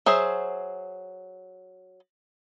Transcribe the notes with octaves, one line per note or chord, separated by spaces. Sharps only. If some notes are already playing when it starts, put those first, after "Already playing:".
F#3 G#4 C5 E5